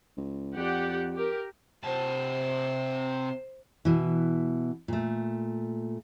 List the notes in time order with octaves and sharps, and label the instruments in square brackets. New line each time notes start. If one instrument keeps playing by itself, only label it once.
[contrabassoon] C#2
[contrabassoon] F2 [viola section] G4 D5 F#5
[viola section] G4 A#4
[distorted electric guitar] C3 A5 [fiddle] C5
[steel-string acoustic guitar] B2 E3
A#2 A3